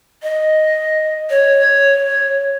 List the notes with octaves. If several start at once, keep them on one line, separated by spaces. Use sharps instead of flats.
D#5
C#5